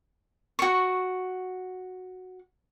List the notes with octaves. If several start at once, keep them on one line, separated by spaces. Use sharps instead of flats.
F#4 C#6